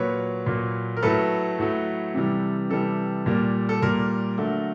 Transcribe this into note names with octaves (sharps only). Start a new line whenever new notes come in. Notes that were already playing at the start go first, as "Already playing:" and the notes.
Already playing: A#2 F#3 A#3 B4 C#5
A#2 F#3 A#3
A#4
A2 F#3 A3 A4 B4
A2 F#3 A3
C3 E3 G3
C3 E3 G3 A4
A#2 G3 A#3
A4
A#2 G3 A#3 A#4
D3 F#3 A3